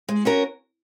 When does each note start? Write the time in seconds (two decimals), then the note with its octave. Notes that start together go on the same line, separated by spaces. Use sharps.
0.09 G#3
0.25 C#4 F#4 A#4 C#5